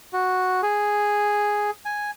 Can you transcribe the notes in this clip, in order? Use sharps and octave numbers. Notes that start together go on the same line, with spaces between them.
F#4
G#4
G#5